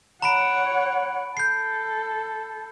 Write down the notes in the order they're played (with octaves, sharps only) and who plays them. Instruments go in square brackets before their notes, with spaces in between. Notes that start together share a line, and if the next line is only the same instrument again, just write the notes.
[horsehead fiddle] C#5 F#5 [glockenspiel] A#5 B5 D7
[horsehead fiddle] A4 [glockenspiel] G6 C7